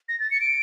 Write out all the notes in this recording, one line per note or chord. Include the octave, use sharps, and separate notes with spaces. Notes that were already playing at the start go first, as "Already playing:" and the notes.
A#6
A6
C#7
D7